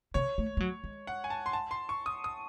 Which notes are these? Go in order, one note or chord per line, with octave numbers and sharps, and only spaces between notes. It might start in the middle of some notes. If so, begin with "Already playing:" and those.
C3 C#5
A3
G#3
F#3
G#3
F#5
G#5
A5
C6
A5
C6
C#6
D#6
D#6